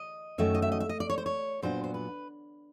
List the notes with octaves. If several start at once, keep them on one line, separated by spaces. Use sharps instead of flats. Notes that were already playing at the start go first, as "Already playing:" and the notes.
Already playing: D#5
F#2 D#3 F#3 A3 E5
D#5
E5
D#5
E5
D#5
D5
C#5
C5
C#5
A#2 F#3 B3 D4 C5
C5
B4